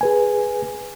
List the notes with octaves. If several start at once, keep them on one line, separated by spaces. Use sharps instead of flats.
G#4 B4 G#5